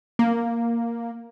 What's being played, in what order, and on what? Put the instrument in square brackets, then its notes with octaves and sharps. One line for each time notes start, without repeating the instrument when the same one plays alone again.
[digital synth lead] A#3